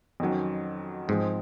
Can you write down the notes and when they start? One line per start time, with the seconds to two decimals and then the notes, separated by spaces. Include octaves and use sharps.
0.20 F2 D#3 F#3 C#4
1.08 G#2 F3 G#3 C4